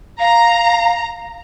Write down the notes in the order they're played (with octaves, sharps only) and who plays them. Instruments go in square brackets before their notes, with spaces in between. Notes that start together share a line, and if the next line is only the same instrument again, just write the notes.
[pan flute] F5 [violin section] A#5